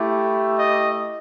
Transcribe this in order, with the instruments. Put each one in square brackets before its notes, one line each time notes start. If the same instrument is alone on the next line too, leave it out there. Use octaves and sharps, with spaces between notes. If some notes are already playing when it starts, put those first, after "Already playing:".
Already playing: [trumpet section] A3 E4 G4
D#5